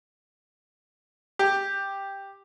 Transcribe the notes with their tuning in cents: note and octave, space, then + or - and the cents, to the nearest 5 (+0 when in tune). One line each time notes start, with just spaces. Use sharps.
G4 +5